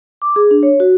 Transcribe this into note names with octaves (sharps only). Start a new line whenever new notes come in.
D6
G#4
D4
C#5
F#4